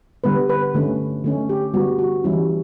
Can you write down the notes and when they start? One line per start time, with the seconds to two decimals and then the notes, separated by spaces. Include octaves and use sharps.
0.24 D3 G3 B3 B4
0.49 B4
0.74 D3 A3 C#4
1.24 D3 A3 C#4
1.49 G4
1.74 D3 G3 B3 F#4
1.99 F#4
2.24 E3 G3 C#4 E4